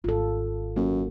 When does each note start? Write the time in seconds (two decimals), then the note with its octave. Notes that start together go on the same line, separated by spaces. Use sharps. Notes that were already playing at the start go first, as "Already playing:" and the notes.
0.04 G#1 D#3 F4 A4
0.76 F#2 A#3